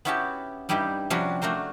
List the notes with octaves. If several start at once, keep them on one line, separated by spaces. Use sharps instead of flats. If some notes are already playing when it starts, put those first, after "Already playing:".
B3 C#4 E4 F#4 G4 A5
G2 G3 D#4 E4 G4
C3 F3 G3 C#4 D4 F#4
A3 D4 F#4 A#4 C5